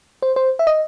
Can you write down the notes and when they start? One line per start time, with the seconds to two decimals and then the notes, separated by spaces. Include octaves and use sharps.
0.22 C5
0.36 C5
0.59 E5
0.67 D#5